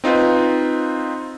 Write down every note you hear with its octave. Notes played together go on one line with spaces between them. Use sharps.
C4 D#4 F4 B4